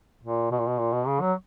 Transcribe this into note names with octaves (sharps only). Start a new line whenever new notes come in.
A#2
B2
A#2
B2
A#2
B2
C#3
F#3